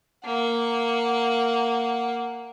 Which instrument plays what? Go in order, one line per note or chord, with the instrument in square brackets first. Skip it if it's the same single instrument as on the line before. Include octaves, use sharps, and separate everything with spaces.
[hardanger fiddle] A#3 F#5